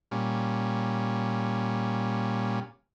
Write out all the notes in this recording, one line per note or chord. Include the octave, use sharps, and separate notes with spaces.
A#2 G3 C#4